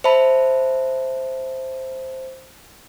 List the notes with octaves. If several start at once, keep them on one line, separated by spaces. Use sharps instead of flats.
C5 E5 A5 B5